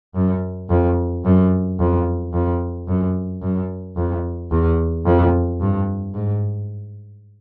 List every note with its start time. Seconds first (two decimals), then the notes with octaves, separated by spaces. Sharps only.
0.15 F#2
0.70 F2
1.25 F#2
1.79 F2
2.33 F2
2.88 F#2
3.42 F#2
3.96 F2
4.51 E2
5.06 F2
5.60 G2
6.14 G#2